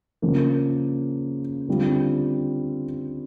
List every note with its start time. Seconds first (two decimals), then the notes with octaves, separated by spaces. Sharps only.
0.22 C#3 F3 A#3
1.68 D3 G3 C4 F4